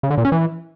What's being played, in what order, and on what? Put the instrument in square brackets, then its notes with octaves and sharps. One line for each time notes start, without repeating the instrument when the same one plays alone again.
[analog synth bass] C#3
D3
A#2
C#4
E3